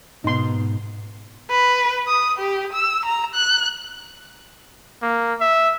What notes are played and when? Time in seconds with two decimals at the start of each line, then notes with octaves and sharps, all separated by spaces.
0.24 G#2 B2 D#4 C6
1.51 B4
2.07 D#6
2.39 G4
2.74 E6
3.06 A#5
3.35 F#6
5.02 A#3
5.41 E5